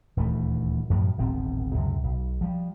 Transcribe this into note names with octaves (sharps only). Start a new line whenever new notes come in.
D#1 D2 E3 A3
F#2 A2 C#3 F3
D1 G#1 B2 C4
C#2 F#2 C3
B1
F3 G3